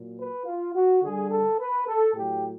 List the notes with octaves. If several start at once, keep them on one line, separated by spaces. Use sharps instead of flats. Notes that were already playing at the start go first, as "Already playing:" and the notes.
Already playing: A#2 F#3
B4
F4
F#4
D3 G3 G#4
A4
B4
A4
A2 F#3 G4